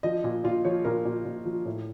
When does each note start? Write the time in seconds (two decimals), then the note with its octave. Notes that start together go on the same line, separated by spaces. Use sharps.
0.03 F3 D#5
0.24 A#2
0.44 A#2 F4
0.65 F3 C#5
0.85 A#2 A#4
1.05 A#2
1.25 A#2
1.45 F3
1.66 A2